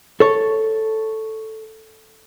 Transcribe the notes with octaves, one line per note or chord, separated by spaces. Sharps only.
A4 C#5